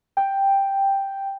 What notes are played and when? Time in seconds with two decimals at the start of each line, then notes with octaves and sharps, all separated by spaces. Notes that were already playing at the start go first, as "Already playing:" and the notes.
0.17 G5